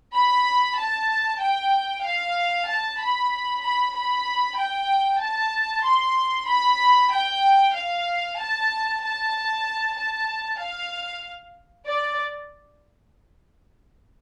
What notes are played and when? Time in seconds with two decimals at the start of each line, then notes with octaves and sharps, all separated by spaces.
0.16 B5
0.79 A5
1.42 G5
2.06 F5
2.70 A5
3.01 B5
3.64 B5
3.97 B5
4.59 G5
5.24 A5
5.86 C6
6.49 B5
7.13 G5
7.77 F5
8.39 A5
9.04 A5
9.98 A5
10.62 F5
11.88 D5